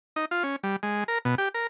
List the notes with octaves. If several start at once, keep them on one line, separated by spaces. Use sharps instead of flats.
D#4
F4
C#4
G3
G#3
A#4
B2
G4
A#4